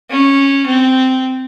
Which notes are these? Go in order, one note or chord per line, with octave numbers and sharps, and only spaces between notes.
C#4
C4